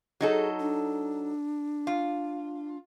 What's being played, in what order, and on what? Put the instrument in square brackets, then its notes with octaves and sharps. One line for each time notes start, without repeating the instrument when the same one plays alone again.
[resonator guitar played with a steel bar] F#3 D#4 A4 [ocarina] G#4
[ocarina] D4
[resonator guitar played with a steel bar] F4